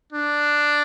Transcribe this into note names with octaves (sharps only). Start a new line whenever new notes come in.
D4